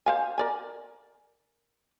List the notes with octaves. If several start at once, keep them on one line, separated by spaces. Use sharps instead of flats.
C5 F5 G#5
A#4 D5 G#5